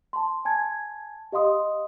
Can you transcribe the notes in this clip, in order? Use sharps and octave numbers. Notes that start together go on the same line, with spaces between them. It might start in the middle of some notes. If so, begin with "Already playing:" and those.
A5 C6
G#5 A5 G#6
G4 D#5 F5 C6 D#6